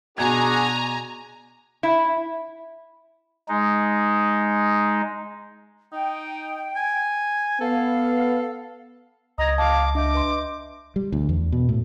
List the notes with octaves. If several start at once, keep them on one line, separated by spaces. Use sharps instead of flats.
B2 D4 F#4 G#4 G#5 A#5 G#6
E4
G#3 D#4
D#4 G5
G#5
B3 A4 F5
C#2 D#5 A#5 D#6 G#6
F5 A5 D6
D4 D#5 E5 D6 G6
B4 C6
G3
D2
E2
B2
A2